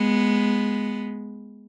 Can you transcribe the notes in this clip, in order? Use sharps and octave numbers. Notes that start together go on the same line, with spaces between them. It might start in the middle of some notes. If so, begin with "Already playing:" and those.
Already playing: G#3 B3